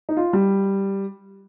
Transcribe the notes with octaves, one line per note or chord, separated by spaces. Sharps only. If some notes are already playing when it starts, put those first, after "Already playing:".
D#4
F4
G3